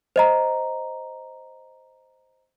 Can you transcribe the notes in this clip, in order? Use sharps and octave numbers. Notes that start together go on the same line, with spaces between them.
C5 D#5 A#5